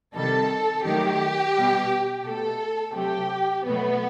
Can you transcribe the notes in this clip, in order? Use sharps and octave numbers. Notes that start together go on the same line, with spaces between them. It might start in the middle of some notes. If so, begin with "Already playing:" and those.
C3 D#3 G3 A4
D#3 F#3 A3 G4
B2 G3
B2 A3 A4
C3 F#3 A3 G4
B2 F#3 A3 B3